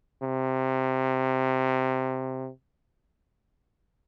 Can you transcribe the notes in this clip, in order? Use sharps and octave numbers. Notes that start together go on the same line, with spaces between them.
C3